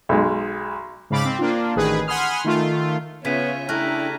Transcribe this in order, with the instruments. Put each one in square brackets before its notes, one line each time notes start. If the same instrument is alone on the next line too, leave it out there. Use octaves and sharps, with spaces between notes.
[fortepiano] B1 G#3
[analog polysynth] G#2 C#3 F5 B5 D6 A6
C4
A#3 D4 F4
A1 D#3 G#4 B4
F#5 G#5 B5 C6 D#6 F6
D#3 A3 F4
[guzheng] C#3 [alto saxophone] B3 [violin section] F4 C#5 E5 [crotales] G#6 B6 D#7
[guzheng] A3 [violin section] D4 G4 A#5 [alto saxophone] E4 [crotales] F6 F#6 A#6